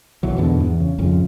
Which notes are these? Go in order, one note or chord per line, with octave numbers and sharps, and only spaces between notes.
B1 E3 F#3
E2 G#2 B2 D3
E2
C#3
G#1 F2 C#3